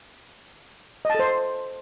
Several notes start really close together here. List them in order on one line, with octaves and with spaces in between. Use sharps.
D#5 A5 A4 C5